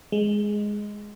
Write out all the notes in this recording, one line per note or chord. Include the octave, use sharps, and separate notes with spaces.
G#3